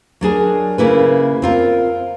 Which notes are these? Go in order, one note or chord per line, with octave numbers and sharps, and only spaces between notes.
F#3 D4 G#4 A#4
C#3 A#3 E4 B4
C4 F4 A#4